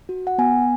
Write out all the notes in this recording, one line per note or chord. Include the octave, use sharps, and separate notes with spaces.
F#4
F#5
B3 G#5